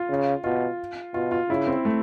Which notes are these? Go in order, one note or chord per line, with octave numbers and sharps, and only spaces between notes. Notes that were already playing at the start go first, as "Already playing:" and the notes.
Already playing: F4
C#3
B2 F4
B2 F4
F4
C#3 E4
C4
A3